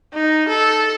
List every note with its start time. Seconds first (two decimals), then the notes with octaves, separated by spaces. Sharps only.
0.14 D#4
0.49 A4